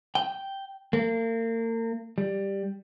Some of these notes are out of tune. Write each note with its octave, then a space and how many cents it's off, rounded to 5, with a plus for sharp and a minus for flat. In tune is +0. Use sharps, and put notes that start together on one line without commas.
G5 -5
A#3 -40
G3 +5